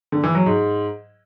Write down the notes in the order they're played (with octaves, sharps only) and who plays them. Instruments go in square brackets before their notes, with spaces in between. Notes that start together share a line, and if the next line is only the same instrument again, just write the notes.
[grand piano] D3
E3
F#3
G#2